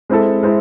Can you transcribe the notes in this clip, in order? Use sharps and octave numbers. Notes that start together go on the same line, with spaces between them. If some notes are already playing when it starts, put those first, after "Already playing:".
G#3 C4 E4 A4
G#3 C4 E4